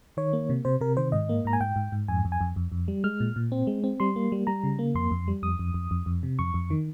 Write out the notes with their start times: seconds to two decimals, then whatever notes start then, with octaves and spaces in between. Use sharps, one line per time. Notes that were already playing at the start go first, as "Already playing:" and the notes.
0.17 D#3 C#5
0.33 A#3
0.49 C3
0.65 C3 C5
0.81 C3 A#4
0.97 D#3 C5
1.12 G#2 D#5
1.29 A#3
1.45 G#2 A#5
1.53 G#5
1.60 G#2 G5
1.76 G#2
1.92 G#2
2.08 F2 G#5
2.25 F2
2.32 G#5
2.41 F2
2.56 F2
2.72 F2
2.88 G3
3.04 G#3 F6
3.20 A#2
3.36 A#2
3.52 C4
3.67 G#3
3.84 C4
4.00 G3 C6
4.16 A#3
4.32 G3
4.47 G3 A#5
4.64 C#3
4.79 A#3
4.95 F2 C6
5.11 F2
5.28 G3
5.43 F2 D#6
5.59 F2
5.74 F2
5.91 F2
6.06 F2
6.23 C3
6.39 F2 C#6
6.54 F2
6.70 D#3